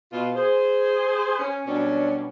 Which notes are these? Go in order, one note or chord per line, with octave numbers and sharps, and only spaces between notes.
B2 F4
G#4 C5
C#4
B2 F#3 G3 C#4 D4